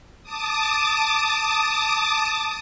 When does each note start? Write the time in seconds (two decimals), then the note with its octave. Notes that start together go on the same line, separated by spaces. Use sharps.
0.23 A5 D6 D#6